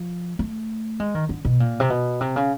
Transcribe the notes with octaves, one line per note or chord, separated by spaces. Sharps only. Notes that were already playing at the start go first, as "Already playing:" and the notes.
Already playing: F3
A3
G#3
D#3
D3
B2
A#2
C3
B2
C3
C#3